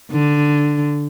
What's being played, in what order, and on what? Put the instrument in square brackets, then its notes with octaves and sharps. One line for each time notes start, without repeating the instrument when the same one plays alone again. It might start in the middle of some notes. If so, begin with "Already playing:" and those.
[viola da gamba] D3